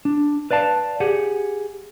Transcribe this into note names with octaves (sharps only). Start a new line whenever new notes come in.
D4
B4 D5 F5 A5
G4 G#4 F#5